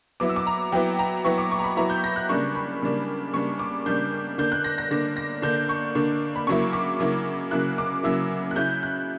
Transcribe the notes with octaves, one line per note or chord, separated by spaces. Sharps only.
F#3 B3 E4 D6
E6
D6
A#5
F#3 B3 E4 G5
A#5
F#3 B3 E4 C#6
D6
C#6
A#5
B5
F#3 B3 E4 A#5
G6
A#6
F#6
C#3 G3 A#3 D4 C#6
B5
C#3 G3 A#3 D4
C#3 G3 A#3 D4 C#6
D6
C#3 G3 A#3 D4 G6
D3 A#3 D4 G6
F#6
A#6
A#6
D3 A#3 D4 A#6
A#6
D3 A#3 D4 G6
C#6
D3 A#3 D4
B5
C#3 F#3 A#3 E4 C#6
D6
C#3 F#3 A#3 E4
C#3 F#3 A#3 E4 F#6
D6
C#3 F#3 A#3 E4 E6
F#6
C#3 F#3 C#4 E4 G6
F#6